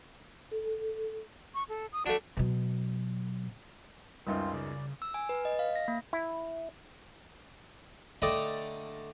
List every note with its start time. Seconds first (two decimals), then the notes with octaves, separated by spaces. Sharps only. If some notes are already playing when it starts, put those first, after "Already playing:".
0.52 A4
1.54 C#6
1.69 A4
1.93 D#6
2.06 A3 D4 F#4
2.37 B2 F#3
4.27 C#2 F#2 G3 C4 D#4 F4
4.53 C#3 D5
5.02 E6
5.14 G#5
5.29 B4
5.45 D#5
5.59 F5
5.76 A#6
5.88 A#3
6.13 E4
8.22 D3 A3 D5 D#5 G5 A#5